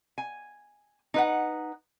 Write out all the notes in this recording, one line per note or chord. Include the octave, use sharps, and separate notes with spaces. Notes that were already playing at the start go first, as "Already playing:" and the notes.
G#5
D#4 B4 F#5